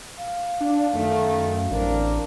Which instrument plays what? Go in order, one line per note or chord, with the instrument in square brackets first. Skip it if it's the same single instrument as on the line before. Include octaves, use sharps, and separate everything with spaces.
[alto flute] F5
[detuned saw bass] D4
[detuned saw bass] F#2 [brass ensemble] D#3 A3
[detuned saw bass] A1 [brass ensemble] C4 D4 A#4